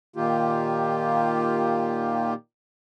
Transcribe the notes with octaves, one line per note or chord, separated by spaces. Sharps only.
A#2 D#3 A#3 F4 G4